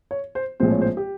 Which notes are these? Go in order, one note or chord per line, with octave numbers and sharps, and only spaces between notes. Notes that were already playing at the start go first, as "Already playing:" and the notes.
C#5
C5
A#1 A2 F3 G#3 C4 C5
C#5
C5
G4